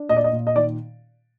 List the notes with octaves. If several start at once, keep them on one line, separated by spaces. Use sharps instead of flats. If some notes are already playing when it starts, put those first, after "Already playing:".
Already playing: D4
A#2 D#5
D5
D#5
A#2
D#5
D#3 D5